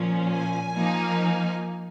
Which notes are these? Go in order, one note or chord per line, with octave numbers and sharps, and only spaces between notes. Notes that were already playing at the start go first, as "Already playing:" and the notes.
Already playing: A#2 F3 C#4
G#5
F3 A#3 D#4